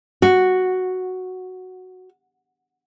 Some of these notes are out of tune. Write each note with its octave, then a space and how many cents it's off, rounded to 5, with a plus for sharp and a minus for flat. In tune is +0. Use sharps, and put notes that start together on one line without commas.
F#4 +0